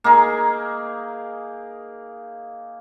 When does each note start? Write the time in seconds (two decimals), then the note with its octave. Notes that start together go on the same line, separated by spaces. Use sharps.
0.04 A#3 D#4 G#4